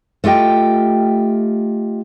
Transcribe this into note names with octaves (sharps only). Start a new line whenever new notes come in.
A3 F4 G4 D#5 G5